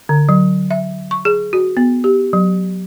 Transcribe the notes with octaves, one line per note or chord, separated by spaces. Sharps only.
D3
F#3
E5
C#6
G#4
F#4
B3
G4
F#3